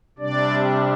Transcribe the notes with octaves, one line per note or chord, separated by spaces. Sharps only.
C3 G3 D4 D5